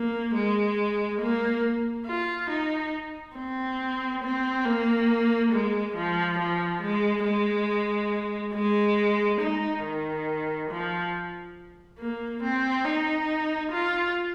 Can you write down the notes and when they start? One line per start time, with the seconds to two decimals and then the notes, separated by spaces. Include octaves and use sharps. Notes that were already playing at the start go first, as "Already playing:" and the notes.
Already playing: A#3
0.34 G#3
1.21 A#3
2.06 F4
2.50 D#4
3.37 C4
4.23 C4
4.65 A#3
5.52 G#3
5.96 F3
6.39 F3
6.81 G#3
7.25 G#3
8.54 G#3
9.41 D#4
9.83 D#3
10.70 F3
11.99 A#3
12.43 C4
12.85 D#4
13.72 F4